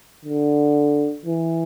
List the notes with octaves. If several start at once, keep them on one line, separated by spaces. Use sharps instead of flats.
D3
E3